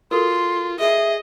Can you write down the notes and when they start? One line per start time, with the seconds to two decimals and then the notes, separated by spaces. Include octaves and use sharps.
0.11 F4 F#4 A4 A#4 C6
0.80 G#4 D#5 E5